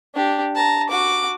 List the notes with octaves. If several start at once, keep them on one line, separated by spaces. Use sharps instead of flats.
D4 G4
A5 A#5
F#4 D6